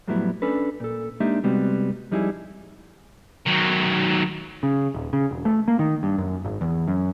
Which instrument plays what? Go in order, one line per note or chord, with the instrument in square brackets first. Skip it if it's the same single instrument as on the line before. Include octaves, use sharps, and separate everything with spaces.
[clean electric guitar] F2 A2 F#3 G3 B3 E4
C#4 D4 A4 B4
A#2 A4
G#3 A#3 D4 D#4 G4 E5
C3 G3 G#3 B3 C4 F#4
F2 G3 D#4 E4 F#4 G#4
[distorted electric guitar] D#3 F#3
[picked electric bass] C#3
D#1
C#3
E1
A3
A#3
D#3
G2
F#2
G#1
E2
F#2